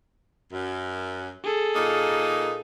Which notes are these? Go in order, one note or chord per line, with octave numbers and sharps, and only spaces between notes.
F#2
G#4 A4
A#2 A#3 D#4